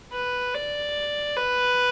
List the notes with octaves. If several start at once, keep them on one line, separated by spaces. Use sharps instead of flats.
B4
D5
B4